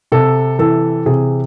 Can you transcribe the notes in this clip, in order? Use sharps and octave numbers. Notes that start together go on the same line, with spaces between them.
C3 A4
E3 A4
C3 G#4